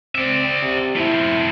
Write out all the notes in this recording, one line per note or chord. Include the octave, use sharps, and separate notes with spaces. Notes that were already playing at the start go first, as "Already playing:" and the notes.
C4 D5 E5
C3
A3 C4 E4